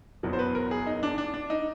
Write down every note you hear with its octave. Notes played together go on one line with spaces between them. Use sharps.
F#1 E2 B2 F#3
C5
B4
A#4
G#4
D#4
D4
D4
D4
D#4